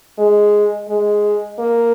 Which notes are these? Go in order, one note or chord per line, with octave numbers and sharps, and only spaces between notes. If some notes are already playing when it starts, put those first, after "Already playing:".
G#3
G#3
A#3